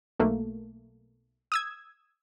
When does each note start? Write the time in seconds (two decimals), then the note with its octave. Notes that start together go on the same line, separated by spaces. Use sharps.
0.19 B1 A3 A#3
1.52 D#6 E6 G#6